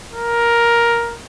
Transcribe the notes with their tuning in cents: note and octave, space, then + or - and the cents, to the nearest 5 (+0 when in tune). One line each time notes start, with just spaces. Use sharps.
A#4 +10